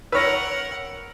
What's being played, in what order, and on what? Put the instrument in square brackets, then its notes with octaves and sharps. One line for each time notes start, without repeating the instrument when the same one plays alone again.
[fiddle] A#4 F#5 [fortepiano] B4 C#5 [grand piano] E6 F6 A#6